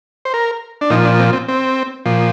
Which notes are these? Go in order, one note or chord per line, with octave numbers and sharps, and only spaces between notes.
C5
A#4
D4
A#2 F3 D#4
D4
C4
C4
C4
A#2 F3